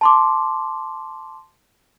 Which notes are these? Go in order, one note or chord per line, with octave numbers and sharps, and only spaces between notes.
A5 C6 D6